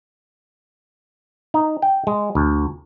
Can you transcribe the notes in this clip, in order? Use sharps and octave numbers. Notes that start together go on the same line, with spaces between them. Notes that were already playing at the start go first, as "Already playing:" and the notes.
D#4
G5
G#3
D2